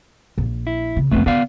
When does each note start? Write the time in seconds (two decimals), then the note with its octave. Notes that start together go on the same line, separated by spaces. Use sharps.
0.38 A#1
0.67 E4
0.97 C#3
1.11 F2 C#3 A3 B3 C4
1.26 D3 B3 D5 F5